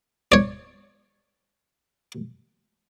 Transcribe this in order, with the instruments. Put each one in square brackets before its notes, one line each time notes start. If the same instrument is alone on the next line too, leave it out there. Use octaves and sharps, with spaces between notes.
[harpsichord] C#5 D5